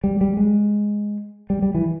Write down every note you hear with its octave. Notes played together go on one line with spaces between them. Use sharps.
G3
G3
G#3
G3
G3
E3